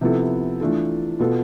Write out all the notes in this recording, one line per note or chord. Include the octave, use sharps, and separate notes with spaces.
C3 F3 B3 E4 A4
E3 A3 D4 F4 A4
B2 B3 F4 A4